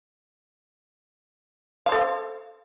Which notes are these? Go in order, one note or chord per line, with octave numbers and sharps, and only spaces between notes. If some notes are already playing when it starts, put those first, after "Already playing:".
A4 C5 F5